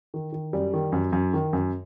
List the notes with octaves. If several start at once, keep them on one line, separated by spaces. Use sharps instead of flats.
D#3
D#3
F#2 G3
D#3
F#2
F#2
D#3
F#2